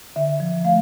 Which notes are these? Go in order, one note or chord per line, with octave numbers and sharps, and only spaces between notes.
D3 E5
F3
A3 F5